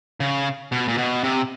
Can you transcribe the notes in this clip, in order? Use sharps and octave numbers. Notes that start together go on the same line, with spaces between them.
C#3
B2
A#2
B2
C3